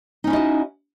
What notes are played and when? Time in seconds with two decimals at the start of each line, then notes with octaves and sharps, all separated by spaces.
0.24 D#4
0.27 C#4
0.30 E4
0.33 D#5
0.36 F#4